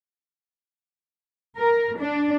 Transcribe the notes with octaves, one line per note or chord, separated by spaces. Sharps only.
A#4
D4